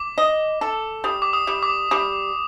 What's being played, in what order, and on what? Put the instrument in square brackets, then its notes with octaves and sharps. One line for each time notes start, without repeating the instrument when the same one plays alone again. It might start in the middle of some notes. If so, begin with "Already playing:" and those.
Already playing: [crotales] D6
[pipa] D#5
A4
[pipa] G3 [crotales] D#6
[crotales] D6
D#6
[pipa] G3
[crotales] D6
[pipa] G3 [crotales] D#6